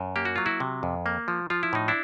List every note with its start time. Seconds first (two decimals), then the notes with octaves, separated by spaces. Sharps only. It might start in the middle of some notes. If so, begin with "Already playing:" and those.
Already playing: F#2
0.16 A#3 G4
0.25 F#4
0.36 F#3 F4
0.46 E4 F#4
0.60 C3
0.83 F2
1.06 A#3
1.28 F3
1.50 F3 F4
1.63 E4
1.73 A2 D#4
1.88 D4 E4